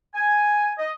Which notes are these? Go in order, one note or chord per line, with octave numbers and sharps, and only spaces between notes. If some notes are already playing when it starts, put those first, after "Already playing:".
G#5
D#5